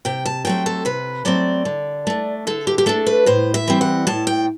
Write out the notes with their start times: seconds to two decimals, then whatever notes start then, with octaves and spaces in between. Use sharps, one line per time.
0.05 C3 G5
0.25 A5
0.45 F#3 A3 C4 G5
0.66 A4
0.85 C3 B4
1.25 F#3 A3 C4 D5
1.65 D3
2.07 A3 D4
2.47 D3 A4
2.67 G4
2.78 G4
2.86 A3 D4 A4
3.07 B4
3.26 A2 C5
3.54 E5
3.68 E3 G3 C4
3.81 F#5
4.07 A2 A5
4.27 G5